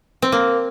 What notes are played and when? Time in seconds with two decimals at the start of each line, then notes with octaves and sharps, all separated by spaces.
0.22 C4
0.32 A#3